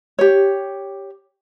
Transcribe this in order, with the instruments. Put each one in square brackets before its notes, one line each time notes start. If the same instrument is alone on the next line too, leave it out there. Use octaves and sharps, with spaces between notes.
[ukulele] G4 C#5